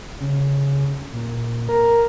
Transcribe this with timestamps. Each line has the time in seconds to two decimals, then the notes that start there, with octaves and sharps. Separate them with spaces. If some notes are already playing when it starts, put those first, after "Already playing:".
0.20 C#3
1.13 A#2
1.69 A#4